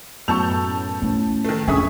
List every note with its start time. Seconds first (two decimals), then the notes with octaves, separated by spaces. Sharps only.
0.28 F#2 A2 B3 A5 C#6 E6 G6 F7
1.02 A2 C#4
1.45 D#3 A3 A4 A#4
1.68 A#1 F2 C#4 D4 G#4 E5 C#6 D#6